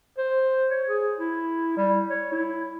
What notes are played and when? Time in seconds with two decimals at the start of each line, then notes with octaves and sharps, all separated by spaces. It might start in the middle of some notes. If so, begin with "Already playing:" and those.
0.18 C5
0.71 C#5
0.87 G#4
1.19 E4
1.77 G3
2.10 C#5
2.32 E4